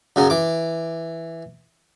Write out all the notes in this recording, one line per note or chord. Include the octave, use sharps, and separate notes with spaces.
F#2 C#3 F#3 C#4
E3 D6